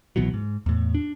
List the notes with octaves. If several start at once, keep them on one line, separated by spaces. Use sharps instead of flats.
C2 B2 E3 F#3
G#2
E2 A2
D4